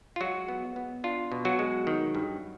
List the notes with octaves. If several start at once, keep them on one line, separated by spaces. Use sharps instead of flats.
F4
F#3 G#3 F#4
B3
B3
D4 F4
B2
F#3 F#4
G#3
D#3
G2